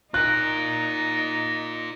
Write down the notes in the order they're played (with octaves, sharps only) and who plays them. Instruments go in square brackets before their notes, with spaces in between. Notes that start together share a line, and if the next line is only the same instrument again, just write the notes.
[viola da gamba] D#4 [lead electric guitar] F4 A#4 [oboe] A#5 [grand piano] F#6